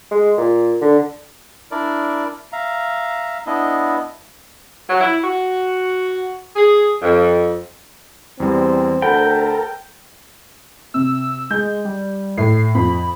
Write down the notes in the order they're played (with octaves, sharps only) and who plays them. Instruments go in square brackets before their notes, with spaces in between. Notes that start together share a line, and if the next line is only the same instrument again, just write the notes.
[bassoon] G#3
A#2
D3
[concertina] D4 E4 A#4 D5
E5 F5 A#5
B3 D4 E4 D#5
[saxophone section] F#3
E4
F#4
G#4
F2
[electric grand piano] E2 G3 [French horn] C4
[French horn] D2 [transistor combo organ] A4 A#4 [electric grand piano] C5 F#5 B5 [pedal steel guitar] G5
[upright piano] C3 [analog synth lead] E6
[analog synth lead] G#3 [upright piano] G6
[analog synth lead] G3
[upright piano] A2 [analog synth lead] C7
[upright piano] F2 [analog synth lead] B5